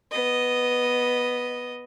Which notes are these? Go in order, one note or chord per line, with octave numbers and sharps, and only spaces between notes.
B3 D#5